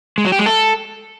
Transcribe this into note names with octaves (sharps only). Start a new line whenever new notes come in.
G#3
F#3
G4
G#3
A4